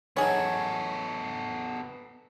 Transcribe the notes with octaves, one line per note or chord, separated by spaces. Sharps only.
E3 F#3 B3 D#4 G#4 A4 C#5